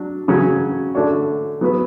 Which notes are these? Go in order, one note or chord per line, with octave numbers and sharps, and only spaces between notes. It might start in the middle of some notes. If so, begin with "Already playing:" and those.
Already playing: F#3 D4
C#3 F#3 C#4 F#4
D3 A3 D4 F#4 C#5
F#3 B3 F#4 B4